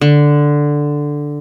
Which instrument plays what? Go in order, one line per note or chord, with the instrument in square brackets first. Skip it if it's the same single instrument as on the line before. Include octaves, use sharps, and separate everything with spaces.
[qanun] D3